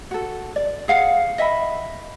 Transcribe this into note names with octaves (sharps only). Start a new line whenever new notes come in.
F#4 A4
D5
G#4 F5 F#5
D#5 E5 F#5 B5